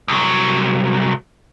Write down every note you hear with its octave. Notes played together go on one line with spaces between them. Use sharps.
C2 F#3